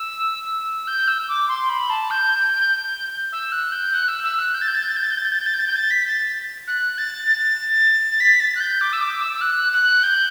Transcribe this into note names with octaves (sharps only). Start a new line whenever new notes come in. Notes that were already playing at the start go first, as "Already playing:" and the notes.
Already playing: E6
G6
E6
D6
C6
B5
A5
G6
E6
F#6
G6
F#6
E6
E6
F#6
G6
A6
G6
A6
G6
A6
G6
A6
G6
A6
G6
A6
G6
A6
G6
A6
G6
A6
B6
A6
F#6
A6
B6
A6
F#6
G6
D6
E6
D6
E6
E6
F#6
F#6
G6